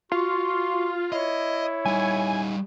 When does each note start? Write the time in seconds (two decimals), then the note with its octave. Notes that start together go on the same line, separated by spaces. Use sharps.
0.12 F4 F#4 C6
1.12 E4 C#5 D#5
1.86 G3 D#4 G#5